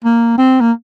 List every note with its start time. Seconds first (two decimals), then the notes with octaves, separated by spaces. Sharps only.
0.05 A#3
0.38 C4
0.61 A#3